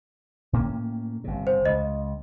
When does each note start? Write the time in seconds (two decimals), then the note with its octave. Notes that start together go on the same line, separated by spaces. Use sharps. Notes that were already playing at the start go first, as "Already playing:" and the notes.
0.53 A2 A#3 C#4
1.24 G1 C3
1.47 C5
1.65 C#2 D#5